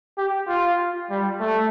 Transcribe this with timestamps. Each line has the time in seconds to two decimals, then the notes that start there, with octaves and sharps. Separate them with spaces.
0.18 G4
0.48 F4
1.10 G3
1.40 A3